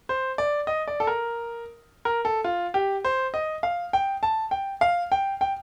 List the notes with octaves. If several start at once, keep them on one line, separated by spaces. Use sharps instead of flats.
C5
D5
D#5
D5
A4
A#4
A#4
A4
F4
G4
C5
D#5
F5
G5
A5
G5
F5
G5
G5